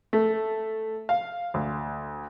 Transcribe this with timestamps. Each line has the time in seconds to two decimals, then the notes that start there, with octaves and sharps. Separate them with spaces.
0.13 A3
1.09 F5
1.54 D2